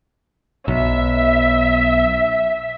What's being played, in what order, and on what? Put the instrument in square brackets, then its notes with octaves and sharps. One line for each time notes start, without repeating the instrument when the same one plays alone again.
[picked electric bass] B1 [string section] E5